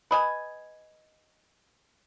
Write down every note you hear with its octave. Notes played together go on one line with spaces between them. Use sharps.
B4 D#5 G#5